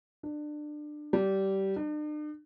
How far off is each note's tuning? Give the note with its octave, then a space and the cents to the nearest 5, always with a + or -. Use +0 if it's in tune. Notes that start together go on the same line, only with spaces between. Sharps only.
D4 +25
G3 -20
D4 +45